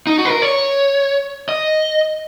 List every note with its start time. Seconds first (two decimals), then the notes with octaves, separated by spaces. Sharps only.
0.07 D#4
0.18 F#4
0.25 B4
0.30 A#4
0.42 C#5
1.49 D#5